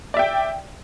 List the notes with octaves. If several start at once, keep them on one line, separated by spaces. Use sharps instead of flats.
D5 E5 G5